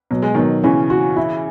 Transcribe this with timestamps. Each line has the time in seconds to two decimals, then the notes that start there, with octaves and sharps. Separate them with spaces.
0.11 B2 F#3
0.23 G#3
0.34 B2 D#3 F#3
0.64 C#3 E3 C#4
0.90 F#4
1.17 E4